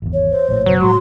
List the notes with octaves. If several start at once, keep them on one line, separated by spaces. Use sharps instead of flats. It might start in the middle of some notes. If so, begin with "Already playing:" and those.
G#1 E2
C#5
C5
A#1 A2 C#5
F#1 B2 F#3 C5
A2 G#3 F#4 C6